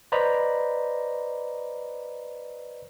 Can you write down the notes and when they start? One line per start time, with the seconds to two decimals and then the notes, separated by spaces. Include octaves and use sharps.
0.12 B4 C5 D5 D#5 A#5 B5